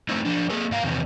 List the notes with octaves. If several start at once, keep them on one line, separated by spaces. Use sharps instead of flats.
A3 C4 D#4 E4
F3 D4
A#3 G#4 A4
G#2 F5 A#5
E2 C3 D#3